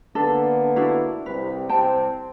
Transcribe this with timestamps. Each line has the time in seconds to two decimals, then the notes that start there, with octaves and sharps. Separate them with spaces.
0.15 D3 A#3 B3 D4 A4 B4
0.76 D4 E4 F#4
1.26 C2 C3 B4
1.69 C2 C3 C4 G5 A5